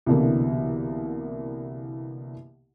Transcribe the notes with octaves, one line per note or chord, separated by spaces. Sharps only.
C2 B2 D3 E3 A#3